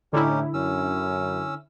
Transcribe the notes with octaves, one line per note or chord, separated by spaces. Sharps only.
A2 D3 C#4 D#4 E4 G4
F#2 C#4 E6